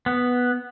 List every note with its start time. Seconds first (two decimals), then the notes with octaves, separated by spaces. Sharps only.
0.06 B3